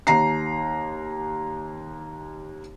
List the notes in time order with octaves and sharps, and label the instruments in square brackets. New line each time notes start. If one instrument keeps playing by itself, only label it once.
[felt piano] D#2 A#5 C7